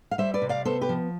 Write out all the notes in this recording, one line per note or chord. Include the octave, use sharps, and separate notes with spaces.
F5
G3 C5 E5
B4 D5
C3
D5 F5
B3 A4 C5
G4 B4
F3